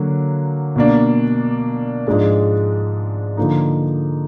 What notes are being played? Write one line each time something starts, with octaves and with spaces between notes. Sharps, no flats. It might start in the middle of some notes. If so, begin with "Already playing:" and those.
Already playing: D3 F#3 A#3
B2 A#3 D4
G#2 F3 G#3 D4
D3 F3 A#3 D#4